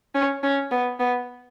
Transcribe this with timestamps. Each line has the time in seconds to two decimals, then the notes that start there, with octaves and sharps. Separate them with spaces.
0.15 C#4
0.43 C#4
0.71 B3
1.00 B3